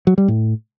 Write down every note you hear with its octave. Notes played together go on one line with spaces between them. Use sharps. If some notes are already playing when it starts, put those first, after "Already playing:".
F#3
G3
A2